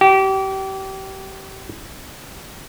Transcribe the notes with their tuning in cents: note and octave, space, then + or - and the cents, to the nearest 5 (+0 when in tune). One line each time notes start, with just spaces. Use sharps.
G4 -30